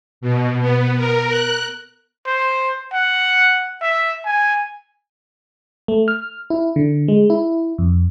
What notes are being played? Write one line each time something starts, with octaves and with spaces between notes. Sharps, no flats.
B2
B3
A#4
F#6
C5
F#5
E5
G#5
A3
F6
E4
D3
G#3
E4
F2